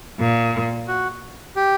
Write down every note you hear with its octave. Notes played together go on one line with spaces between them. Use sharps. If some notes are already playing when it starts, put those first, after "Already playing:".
A#2
F#4
G4